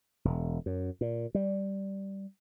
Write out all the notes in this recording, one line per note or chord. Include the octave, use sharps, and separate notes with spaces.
E1
F#2
A#2
G3